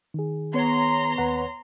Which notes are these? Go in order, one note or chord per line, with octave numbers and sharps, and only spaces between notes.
D#3 G#4
B3 C#5 A#5 C6
D#2 B4 F#5